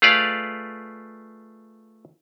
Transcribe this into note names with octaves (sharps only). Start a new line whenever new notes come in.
A3 F4 G#4 B4 D5 F5